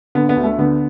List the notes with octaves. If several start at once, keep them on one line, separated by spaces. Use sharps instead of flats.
D3 B3
B3
D2
A3
D3 B3